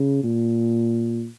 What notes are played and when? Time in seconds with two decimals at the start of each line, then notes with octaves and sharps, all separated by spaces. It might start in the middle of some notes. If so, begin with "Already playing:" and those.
Already playing: C#3
0.24 A#2